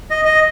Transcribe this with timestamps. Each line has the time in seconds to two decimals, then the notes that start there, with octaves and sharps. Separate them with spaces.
0.10 D#5
0.25 D#5